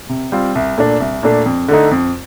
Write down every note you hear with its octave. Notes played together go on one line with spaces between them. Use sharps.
C3
G3 C4 F4
C2
A#2 A3 D4
C2
A#2 A3 D4
F2
D3 A3 D#4
F2